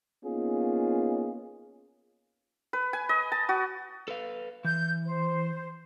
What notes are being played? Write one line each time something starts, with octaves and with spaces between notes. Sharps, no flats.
A#3 B3 C#4 D#4 F4 G#4
B4
G#5
D#5
A5
F#4
A4 B4 F5
E3 G6
C5